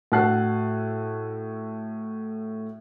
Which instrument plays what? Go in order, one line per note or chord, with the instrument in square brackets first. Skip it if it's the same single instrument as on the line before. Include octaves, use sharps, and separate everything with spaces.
[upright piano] A2 F#4 A4 A5 F#6 C7